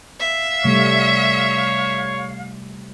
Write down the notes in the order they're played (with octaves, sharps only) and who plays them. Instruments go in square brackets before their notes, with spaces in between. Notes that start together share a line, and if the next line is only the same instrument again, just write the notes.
[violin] E5 [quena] F5
[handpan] C3 G3 A3 [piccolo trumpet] C#5